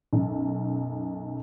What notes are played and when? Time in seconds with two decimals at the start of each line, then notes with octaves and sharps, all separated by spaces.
0.13 B1 F#2